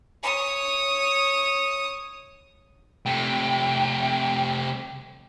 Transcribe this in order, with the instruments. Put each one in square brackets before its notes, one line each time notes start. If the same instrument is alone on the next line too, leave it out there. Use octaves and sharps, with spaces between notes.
[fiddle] C#5 D#6
[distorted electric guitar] C3 A3 [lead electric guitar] G5